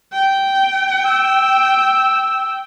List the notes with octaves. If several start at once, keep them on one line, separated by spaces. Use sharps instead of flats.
G5
E6